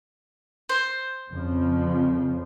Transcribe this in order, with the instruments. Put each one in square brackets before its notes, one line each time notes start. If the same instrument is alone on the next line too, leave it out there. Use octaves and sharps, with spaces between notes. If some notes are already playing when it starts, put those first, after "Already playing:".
[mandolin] C5
[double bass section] F2 C#3 F3